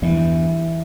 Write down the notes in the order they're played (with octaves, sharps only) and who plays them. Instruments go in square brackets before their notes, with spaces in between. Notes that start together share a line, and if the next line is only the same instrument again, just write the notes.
[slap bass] E2 G2 [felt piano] E3